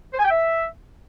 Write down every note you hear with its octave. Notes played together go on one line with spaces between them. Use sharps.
C5
G#5
G5
E5